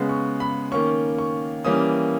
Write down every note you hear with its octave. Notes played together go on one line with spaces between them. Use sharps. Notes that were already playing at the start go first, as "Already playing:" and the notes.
Already playing: C#3 G#3 B3
C#6
B5
D#3 A#3 C#4 C#6
C#6
E3 G3 A#3 C#4 D#6